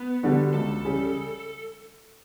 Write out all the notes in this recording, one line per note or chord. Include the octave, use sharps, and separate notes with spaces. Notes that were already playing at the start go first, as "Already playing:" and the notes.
Already playing: B3
D3 G3 D4 F#4
C#2 A4
C#3 G3